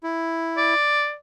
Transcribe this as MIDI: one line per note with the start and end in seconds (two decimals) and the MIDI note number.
0.04 0.74 64
0.57 1.15 74